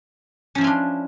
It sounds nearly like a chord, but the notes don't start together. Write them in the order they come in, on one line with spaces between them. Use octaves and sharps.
C#4 F3 E4 F4 D4